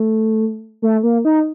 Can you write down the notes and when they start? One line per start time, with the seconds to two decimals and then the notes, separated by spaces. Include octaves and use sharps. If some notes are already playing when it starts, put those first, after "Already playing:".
Already playing: A3
0.82 A3
1.03 A#3
1.25 D#4